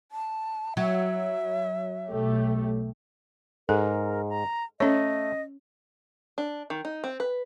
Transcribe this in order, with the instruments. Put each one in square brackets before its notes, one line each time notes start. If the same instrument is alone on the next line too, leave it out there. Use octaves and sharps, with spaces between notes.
[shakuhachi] A5
[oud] F#3 [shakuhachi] E5
[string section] B1 A3 G4
[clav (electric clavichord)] G#2 [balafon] A4 [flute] A#4
[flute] A#5
[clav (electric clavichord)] A3 [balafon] C#4 C#5 [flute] D#5
[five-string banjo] D4
D#3
D#4
C4
B4